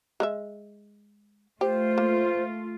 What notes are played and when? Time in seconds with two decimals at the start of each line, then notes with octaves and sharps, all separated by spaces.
0.20 G#3 A#4 E5
1.61 A3 F4 G4 C5
1.98 A#3